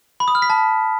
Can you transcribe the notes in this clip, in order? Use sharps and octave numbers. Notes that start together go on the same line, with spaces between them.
B5
D#6
F6
B6
A5